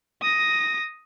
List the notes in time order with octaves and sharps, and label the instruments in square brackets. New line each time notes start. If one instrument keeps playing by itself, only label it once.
[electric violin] D#6 A#6